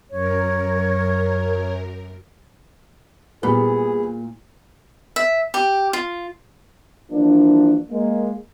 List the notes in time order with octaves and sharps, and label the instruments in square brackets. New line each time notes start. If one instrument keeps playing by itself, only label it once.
[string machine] F#2 A#4 [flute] C#5
[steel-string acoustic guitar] A#2 [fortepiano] G3 B3 [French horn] G#4
[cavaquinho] E5
G4
F4
[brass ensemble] E3 F3 G3 A#3 D4
G#3 A#3